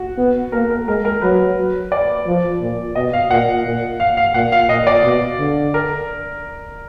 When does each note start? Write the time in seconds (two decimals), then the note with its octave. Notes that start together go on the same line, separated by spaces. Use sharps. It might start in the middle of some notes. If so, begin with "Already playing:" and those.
Already playing: F#4
0.18 B3
0.52 A#3 A#4
0.70 A#4
0.88 G#3 A#4
1.05 A#4
1.22 F#3 B4
1.92 D5
2.27 F3
2.61 A#2
2.95 B2 D#5
3.13 F5
3.31 A#2 F#5
3.65 A#2
4.00 F5
4.17 F5
4.34 A#2 F#5
4.52 F5
4.69 A#2 D#5
4.87 D5
5.04 B2
5.39 D3
5.74 A#4